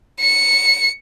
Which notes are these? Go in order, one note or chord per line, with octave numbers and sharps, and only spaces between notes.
C#7